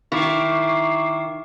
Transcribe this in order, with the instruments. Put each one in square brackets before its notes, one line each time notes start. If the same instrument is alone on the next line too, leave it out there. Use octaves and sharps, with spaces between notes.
[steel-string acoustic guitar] D#3 E4 [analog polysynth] C#6 D6 C7